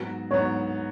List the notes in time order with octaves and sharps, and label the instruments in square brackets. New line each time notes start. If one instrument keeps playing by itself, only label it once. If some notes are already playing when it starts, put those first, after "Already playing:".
Already playing: [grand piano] G#2 F#3 B3 F#4
[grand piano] G#2 F#3 B3 F#4 [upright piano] C#5